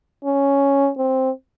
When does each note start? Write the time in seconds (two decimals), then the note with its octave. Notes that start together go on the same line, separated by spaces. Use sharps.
0.24 C#4
0.97 C4